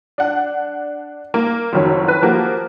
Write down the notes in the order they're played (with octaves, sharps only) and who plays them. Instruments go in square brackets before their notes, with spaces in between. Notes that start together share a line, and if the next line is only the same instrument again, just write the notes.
[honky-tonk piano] D4 F#5
A#3
F#1 F2 D#3 F#3 C#5
B4
F3 A#3 F#4 G4